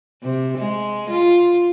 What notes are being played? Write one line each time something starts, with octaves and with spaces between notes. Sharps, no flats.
C3
G#3
F4